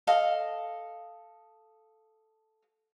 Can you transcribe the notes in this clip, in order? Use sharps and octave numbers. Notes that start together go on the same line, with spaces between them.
A4 D#5 F5